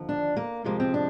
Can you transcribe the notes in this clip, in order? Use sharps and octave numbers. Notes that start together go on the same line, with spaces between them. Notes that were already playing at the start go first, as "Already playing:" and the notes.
Already playing: D#2 D3 F3
D4
A#3
F2 C3 F3 G#3 A#3
C4
D4